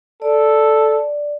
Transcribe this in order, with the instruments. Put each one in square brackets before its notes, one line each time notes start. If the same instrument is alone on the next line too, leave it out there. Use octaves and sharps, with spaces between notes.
[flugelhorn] A4 [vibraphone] D5